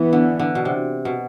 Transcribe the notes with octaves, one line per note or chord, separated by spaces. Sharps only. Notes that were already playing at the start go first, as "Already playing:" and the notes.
Already playing: E3 B3
D3
D3
B2
C3
B2